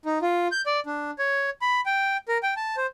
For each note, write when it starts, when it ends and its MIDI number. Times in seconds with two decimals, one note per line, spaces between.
0.05 0.19 63
0.22 0.48 65
0.52 0.62 91
0.66 0.80 74
0.86 1.11 62
1.19 1.50 73
1.62 1.81 83
1.86 2.17 79
2.28 2.38 70
2.43 2.54 79
2.57 2.76 81
2.77 2.86 72